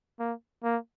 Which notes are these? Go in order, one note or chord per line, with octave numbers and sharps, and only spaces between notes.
A#3
A#3